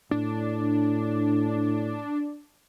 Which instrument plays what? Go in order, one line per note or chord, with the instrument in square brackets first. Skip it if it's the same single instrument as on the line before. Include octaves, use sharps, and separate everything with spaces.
[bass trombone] A2 [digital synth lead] D4